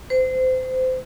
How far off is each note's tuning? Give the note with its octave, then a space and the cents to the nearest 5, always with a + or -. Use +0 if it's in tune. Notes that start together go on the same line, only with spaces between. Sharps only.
C5 -25